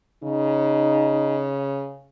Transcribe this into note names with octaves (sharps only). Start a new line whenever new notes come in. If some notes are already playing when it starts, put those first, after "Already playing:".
C#3 D#4